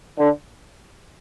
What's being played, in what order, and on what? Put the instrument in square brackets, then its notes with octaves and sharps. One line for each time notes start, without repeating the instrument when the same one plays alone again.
[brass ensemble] D3